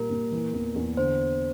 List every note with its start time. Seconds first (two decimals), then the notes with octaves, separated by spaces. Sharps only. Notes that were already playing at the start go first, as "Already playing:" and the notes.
Already playing: A#2 G3 A#4
0.10 A#2
0.32 E3
0.54 E2
0.76 E2
0.97 D3 C5